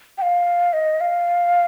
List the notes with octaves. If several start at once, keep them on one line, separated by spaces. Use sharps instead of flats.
G5
F5
D#5
F5